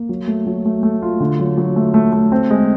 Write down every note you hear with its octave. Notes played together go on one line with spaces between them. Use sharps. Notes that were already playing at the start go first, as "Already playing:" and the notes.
Already playing: A#3
F#3
A3
F#3
A3
A3
F4
D3
F#3
F#3
A3
A3
A3
C4
G#3